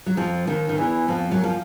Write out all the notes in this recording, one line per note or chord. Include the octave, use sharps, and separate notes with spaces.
F#3
F2 F3
D#2 D#3
D#3
E2 E3
F2 F3
F#2 F#3
F3